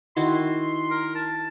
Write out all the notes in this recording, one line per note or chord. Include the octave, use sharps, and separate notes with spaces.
D#3 E4 F#4 C6
A#4
A5